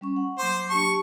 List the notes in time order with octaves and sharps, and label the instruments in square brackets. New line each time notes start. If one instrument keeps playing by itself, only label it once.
[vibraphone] G3 C#4 C#6
F#5
[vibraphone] F#3 A#3 D6 [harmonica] C5
[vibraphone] D4 G4 A5 [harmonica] C#6